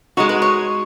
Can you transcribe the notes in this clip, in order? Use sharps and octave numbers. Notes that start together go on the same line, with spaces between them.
G#3 D#4 F#4 C#5
B4
C#5